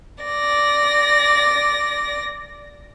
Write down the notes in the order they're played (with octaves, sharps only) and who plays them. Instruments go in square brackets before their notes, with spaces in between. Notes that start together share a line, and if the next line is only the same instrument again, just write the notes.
[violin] D5 A#6